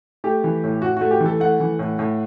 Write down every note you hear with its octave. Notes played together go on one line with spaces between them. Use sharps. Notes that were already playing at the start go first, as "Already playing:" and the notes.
A3 G4
E3
A2
A2 F#4
A3 F#4
G4
E3
A4
A3 F#5
E3
A2
A2